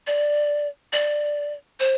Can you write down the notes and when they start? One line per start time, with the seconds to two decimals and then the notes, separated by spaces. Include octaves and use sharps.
0.07 D5
0.93 D5
1.80 C5